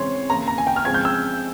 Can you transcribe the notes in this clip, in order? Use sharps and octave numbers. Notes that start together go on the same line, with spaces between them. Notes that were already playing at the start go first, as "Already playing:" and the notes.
Already playing: C#3 E3 G#3 C4 C#5 C6
C#3 E3 A#3 A#5
A#5
G#5
G5
F6
C#3 F3 G#3 C4 G#6
G6
E6